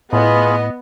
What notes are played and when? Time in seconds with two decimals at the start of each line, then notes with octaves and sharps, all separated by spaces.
0.13 A2 B3 F4 G#4 D#5 B5